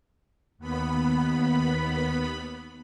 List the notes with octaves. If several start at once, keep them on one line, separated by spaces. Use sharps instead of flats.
D#2 B3 B5